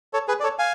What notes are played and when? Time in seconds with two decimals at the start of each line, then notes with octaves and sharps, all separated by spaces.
0.13 A4 C#5
0.28 G#4 B4
0.40 D5
0.43 A4 C#5
0.59 F5 G#5